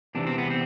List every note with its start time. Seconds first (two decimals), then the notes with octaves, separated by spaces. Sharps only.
0.15 E2 C3 E3 D4
0.27 C4
0.38 B3
0.50 C4